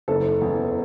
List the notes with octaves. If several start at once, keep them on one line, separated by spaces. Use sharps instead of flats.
F#1 A4
E2